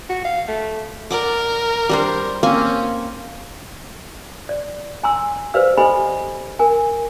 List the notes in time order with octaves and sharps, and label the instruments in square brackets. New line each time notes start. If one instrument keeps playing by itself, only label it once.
[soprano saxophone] F#4
F5
A3
[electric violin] A#4 [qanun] D5 F#5 D6
[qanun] G3 D4 C5
[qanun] A#3 C4 G#5 [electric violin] C#4
[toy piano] D5
G#5 A#5 C6 E6
G4 B4 C5 D5 F5 E6
G4 A4 D#5 G#5 B5 C6
A#4 G#5